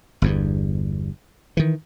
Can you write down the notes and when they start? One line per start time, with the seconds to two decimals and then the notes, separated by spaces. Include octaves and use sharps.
0.22 G1 E2 G2
1.57 D#3 E3